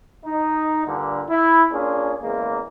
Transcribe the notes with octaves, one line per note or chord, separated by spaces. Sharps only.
D#4
G2 A#2 D3
E4
A#3 C#4 D4 F4 G#4
E2 C#3 G#3 A#3